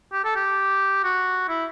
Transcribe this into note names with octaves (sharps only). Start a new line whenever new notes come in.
G4
A4
G4
F#4
E4